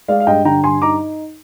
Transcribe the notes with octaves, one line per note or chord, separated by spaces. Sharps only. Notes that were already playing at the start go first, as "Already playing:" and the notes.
G#3 D5 F5
F5
G2 D#5 G5
D3 G5 A#5
G2 G#5 C6
D#4 A#5 D6